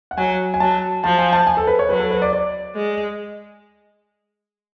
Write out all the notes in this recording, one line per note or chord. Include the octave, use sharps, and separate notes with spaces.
F#5
F#3 G#5
G#5
F#3 A5
F3 A5
G#5
A5
G#5
A4
B4
C#5
F#3 B4
A4
B4
D5
D5
G#3